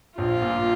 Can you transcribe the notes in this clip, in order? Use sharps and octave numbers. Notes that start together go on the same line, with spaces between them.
A#1 F4
A#2